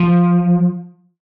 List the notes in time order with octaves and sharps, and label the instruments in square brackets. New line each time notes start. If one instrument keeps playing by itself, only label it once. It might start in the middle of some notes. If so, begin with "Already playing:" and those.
Already playing: [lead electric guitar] F3